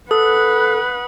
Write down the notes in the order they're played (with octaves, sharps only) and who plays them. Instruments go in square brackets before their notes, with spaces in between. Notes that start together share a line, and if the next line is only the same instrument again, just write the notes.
[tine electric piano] A4 [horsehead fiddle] B4 F#5 [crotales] D#6